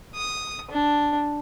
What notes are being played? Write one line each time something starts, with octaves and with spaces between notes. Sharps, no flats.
D#6
D4